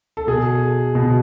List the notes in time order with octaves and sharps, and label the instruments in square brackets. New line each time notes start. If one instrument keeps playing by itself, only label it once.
[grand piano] A4
B2 G#4
B2